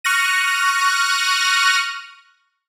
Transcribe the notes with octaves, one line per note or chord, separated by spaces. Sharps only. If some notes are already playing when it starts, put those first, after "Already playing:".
C#6 F6 F#6 A#6 D#7